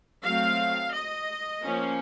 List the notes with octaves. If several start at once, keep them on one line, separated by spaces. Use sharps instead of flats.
F#3 A3 C4 F5
D#5
F3 A#3 C#4